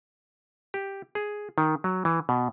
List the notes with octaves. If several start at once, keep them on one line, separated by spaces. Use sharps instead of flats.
G4
G#4
D#3
F#3
E3
B2